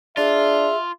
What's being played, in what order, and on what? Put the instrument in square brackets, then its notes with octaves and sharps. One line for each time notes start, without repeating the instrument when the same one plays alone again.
[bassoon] D4 [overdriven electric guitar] F4 [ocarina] G#4 [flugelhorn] E5